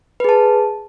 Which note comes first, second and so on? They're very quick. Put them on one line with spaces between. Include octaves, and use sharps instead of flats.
B4 G#4 A5